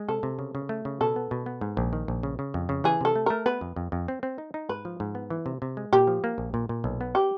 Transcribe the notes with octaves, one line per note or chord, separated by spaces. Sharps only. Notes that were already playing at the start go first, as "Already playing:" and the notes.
Already playing: G#3
C3 A4
C3
C#3
C#3
A3
C#3
B2 A4
B3
B2
B3
G#2
A#1
D#3
A#1
C#3
C#3
F2
C#3
E3 G#4
C3 A4
A3
A3 A#4
B3 B4
F2
F2
F2
C4
C4
D#4
D#4
G#2 B4
F3
G#2
B3
E3
C3
C3
G#3
A#2 G4
F3
A#3
A#1
A#2
A#2
B1
B3
G4